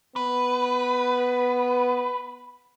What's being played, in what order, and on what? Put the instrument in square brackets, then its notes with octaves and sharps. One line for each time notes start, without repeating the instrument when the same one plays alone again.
[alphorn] B3 [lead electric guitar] B4